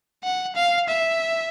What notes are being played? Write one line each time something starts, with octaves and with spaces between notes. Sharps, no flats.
F#5
F5
E5